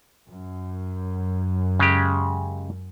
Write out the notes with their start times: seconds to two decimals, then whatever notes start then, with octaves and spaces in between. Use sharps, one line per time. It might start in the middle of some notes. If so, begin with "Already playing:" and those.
0.28 F#2
1.80 C#3 G#3 G4